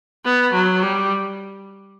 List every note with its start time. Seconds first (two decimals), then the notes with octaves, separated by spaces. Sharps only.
0.25 B3
0.54 F#3
0.83 G3